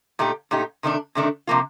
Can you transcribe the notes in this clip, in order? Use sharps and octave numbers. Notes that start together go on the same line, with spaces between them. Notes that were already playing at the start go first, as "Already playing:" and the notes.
A#2 A3 D#4 G4
A#2 A3 D#4 G4
C3 D#3 A3 D4
C3 D#3 A3 D4
C3 F3 A#3 F4